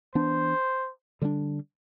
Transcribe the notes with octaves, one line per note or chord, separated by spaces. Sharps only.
E3 B3 D4 C5
D3 G3 B3 D4